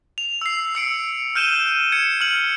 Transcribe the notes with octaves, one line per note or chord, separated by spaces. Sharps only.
F7
E6 C7
E6 C#7 D7
F6 G6 D#7 E7 G7
G#6 C#7
F6 F#7